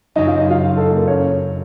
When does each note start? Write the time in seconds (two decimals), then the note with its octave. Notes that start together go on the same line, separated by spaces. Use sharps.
0.15 F#2 C#3 F#3 D#4 D#5
0.27 F4 F5
0.39 D#4 D#5
0.50 F4 F5
0.77 A4
0.92 A#3 A#4
1.08 C#4 C#5